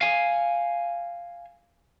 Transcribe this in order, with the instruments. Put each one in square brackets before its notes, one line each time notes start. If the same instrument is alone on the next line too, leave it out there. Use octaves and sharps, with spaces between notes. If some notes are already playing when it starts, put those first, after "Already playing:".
[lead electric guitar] F5 G#5